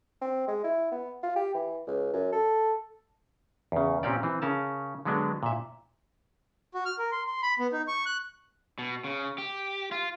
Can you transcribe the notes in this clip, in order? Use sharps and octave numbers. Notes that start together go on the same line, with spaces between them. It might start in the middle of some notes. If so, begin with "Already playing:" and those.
C4
G#3
E4
B3
F4
G4
E3
C#2
F#2
A4
E2 C#3
A#2 C4 C#4 G4 D5
E3 C4
C#3 C#4 A#4 A5
D3 F#3 G#3 B3 D4
A#2 E5
F#4
F6
A#4
C6
C6
B5
B3
D#4
C#6
F#6
B2
C#3
G4
F4